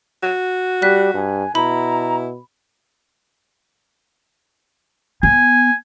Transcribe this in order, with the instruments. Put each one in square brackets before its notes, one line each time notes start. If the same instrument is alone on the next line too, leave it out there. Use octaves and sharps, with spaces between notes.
[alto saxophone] F#4
[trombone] G3 [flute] G4 [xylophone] F#6 B6
[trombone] G2 [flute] G#5
[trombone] B2 [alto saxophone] E4 [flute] A#5 [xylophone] B5
[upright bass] B3 [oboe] G#5